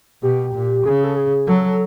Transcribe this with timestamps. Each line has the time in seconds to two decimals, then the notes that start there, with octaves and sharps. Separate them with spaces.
0.22 B2 G4
0.54 A#2
0.85 C#3 G#4
1.04 A4
1.17 G#4
1.48 F#3 A4